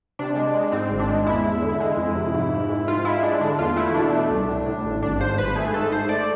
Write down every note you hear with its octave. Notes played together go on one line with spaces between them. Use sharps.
C3 D4
G#3
G#3
G#2 C4
G#1
D4
G#3
E2 E4
E2
D3
G#3
F2
C3
G#2
G#2
G#2
G#2 F4
G#3 E4
G#3 D4
D3 D4
E2 F4
A3 E4
B2 D4
A3
C2
A2
A2
A1
G#1 D4
G#2 C5
G#1 B4
A3 G#4
G#2 A4
G#2 C5
A3 D5